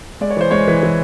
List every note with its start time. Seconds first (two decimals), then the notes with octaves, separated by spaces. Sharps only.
0.21 G#3 D5
0.31 C#5
0.37 E3 C5
0.51 G#3 C#5
0.68 E3
0.83 E3